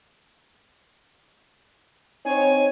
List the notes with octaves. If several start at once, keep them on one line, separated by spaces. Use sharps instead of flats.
C4 D#4 C#5 G#5